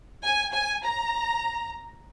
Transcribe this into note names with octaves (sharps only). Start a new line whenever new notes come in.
G#5
G#5
A#5